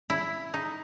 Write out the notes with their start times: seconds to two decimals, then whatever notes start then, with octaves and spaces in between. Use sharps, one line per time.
0.10 E4
0.54 D#4